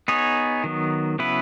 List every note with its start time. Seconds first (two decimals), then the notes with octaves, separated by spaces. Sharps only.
0.08 B3 D#4 G#4 C#5
0.64 D#3 F#3 B3
1.19 C#3 F#3 B3 E4 B4